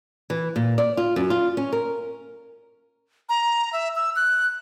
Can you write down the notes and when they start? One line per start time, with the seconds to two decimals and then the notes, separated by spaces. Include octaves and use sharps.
0.30 E3
0.56 A#2
0.78 D5
0.97 F4
1.16 F#2
1.30 F4
1.57 C#4
1.73 A#4
3.29 A#5
3.73 E5
3.96 E6
4.16 F#6